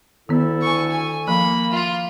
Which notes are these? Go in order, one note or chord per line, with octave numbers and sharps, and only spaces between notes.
D2 D#3 B3 E4 A4
G#5 C#6
G#5
F3 A#3 B5
F4